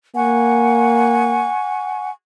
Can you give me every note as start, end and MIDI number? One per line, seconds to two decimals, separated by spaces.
0.16 1.49 58
0.16 2.11 78
0.16 2.11 80
0.16 2.11 85